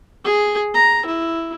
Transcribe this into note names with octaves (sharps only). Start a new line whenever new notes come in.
G#4
A#5
E4